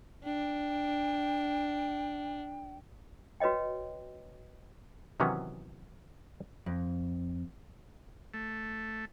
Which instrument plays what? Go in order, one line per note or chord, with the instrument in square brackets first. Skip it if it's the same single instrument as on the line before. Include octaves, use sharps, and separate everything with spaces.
[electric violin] D4 [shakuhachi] G5
[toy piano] F#4 B4 C#5 D#5 G5
[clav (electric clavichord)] C3 D#3 E3 F#3 B3 C#4
[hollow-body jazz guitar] F2
[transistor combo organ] A3